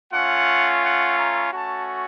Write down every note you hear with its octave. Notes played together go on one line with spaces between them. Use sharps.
A3 C#4 F4 F#5
F#5
A#5
A3 C#4 F#4 A5